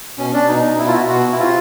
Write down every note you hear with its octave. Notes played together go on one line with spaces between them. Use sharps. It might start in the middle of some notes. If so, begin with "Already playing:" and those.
B2 C#4
D4
B2 D#4
B2 E4
F4
F#4
B2 F#4
E4
C3 F4